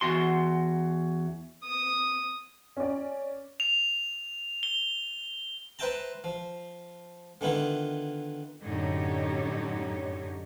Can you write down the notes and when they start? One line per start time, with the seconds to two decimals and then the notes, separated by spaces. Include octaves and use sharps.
0.01 E2 F#4 C6
1.63 D#6
2.77 C#4 D5
3.60 F7
4.63 G7
5.79 B4 C5 E5 G5 A5 A#5
6.24 F3
7.41 D3 D#3 B3 E4 F4
8.64 F#2 A2 D3 D#4 G4 C#5